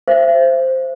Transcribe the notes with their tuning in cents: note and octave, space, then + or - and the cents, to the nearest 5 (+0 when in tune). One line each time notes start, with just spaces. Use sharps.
C5 +0 E5 +40